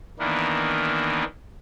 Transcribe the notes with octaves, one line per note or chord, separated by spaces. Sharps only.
D#3 E3 A#3 B3 D4